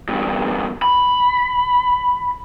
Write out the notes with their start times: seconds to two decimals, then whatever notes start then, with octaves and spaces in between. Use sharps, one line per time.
0.08 E2 G2
0.82 B5